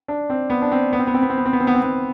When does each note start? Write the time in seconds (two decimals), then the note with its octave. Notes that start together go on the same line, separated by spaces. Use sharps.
0.08 D4
0.30 C4
0.50 B3
0.62 D4
0.72 C4
0.93 B3
0.99 C4
1.07 B3
1.14 C4
1.22 B3
1.30 C4
1.38 B3
1.45 C4
1.53 B3
1.60 C4
1.67 B3
1.74 C4
1.82 B3